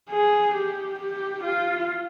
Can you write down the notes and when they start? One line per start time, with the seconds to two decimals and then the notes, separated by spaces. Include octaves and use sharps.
0.10 G#4
0.54 G4
0.99 G4
1.44 F4